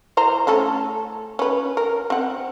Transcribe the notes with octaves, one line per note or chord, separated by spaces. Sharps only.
E3 C5 A#5
A3 C#4 A4
C#4 B4
A#4
C4 F#5